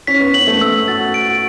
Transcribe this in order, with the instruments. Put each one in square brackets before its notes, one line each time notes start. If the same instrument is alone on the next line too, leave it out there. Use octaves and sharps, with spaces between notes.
[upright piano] C#4 [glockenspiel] B6
[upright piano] B3
[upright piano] C#4 [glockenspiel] F#7
[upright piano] A3
[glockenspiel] E6
[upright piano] F#4 [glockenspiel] A6
[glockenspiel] D7
[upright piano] F#4